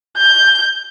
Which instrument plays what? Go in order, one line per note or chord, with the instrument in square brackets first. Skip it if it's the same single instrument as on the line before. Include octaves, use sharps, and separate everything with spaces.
[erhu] G6